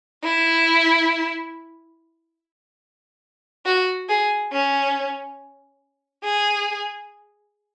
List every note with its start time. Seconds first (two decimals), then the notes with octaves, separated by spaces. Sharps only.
0.23 E4
3.66 F#4
4.09 G#4
4.52 C#4
6.24 G#4